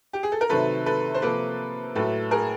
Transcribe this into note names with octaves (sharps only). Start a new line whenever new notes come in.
G4
G#4
A4
A#4
C3 D#3 F#3 A3 A4 B4
A4 B4
C5
C3 F3 A#3 A4 B4
A2 F#3 A3 A4 B4
G#4 A#4